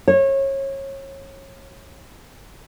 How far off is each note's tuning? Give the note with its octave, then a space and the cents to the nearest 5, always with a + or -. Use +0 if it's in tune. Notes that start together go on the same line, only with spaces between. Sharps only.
C#5 -30